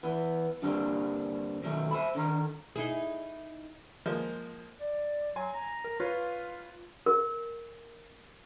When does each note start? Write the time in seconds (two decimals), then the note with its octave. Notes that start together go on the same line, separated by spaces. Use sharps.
0.03 E3 B3
0.62 G2 D3 G3 A#3 C4 D4
1.63 B2 D#3 F#3 A3
1.91 C5 E5 B5
2.15 D3 D#3 A#5
2.76 D#4 E4 G#4
4.06 F3 G#3 A#3
4.80 D5
5.36 F#3 G#5 C6
5.54 A#5
5.84 A#4
6.00 F4 B4 C#5 F5
7.06 A#4